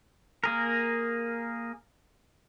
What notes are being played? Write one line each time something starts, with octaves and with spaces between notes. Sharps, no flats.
A#3 G#4 A#4